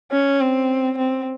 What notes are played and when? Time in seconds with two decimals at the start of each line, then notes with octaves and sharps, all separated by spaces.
0.11 C#4
0.41 C4
0.98 C4